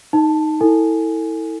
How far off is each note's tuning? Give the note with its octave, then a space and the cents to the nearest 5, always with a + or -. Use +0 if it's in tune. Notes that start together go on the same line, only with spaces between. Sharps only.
D#4 +0 A5 +0
E4 -25 A4 +25 G#5 +10